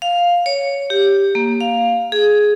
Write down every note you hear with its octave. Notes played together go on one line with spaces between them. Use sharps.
F5
C#5
G4
A#3
F5
G#4